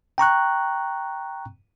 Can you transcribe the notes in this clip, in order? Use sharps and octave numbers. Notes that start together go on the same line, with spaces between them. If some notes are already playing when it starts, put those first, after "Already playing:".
G5 A#5 C#6 F#6